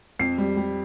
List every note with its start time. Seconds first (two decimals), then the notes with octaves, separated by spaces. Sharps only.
0.19 F2 C7
0.38 G3
0.57 G3